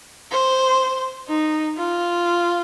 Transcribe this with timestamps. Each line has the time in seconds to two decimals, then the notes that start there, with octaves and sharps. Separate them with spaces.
0.31 C5
1.28 D#4
1.77 F4